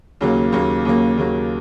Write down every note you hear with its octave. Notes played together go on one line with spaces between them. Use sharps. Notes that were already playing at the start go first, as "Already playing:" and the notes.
D#2 C#3 F#3 A#3
D#2 C#3 F#3 A#3
D#2 C#3 F#3 A#3
D#2 C#3 F#3 A#3